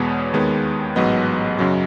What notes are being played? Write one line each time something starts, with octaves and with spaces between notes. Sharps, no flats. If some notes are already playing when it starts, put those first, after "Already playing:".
Already playing: E2 B2 G#3 B3 C#5
D#2 D#3 G#3 B3
A1 G#2 F#3 B3 D#5
F#2 C#3 F#3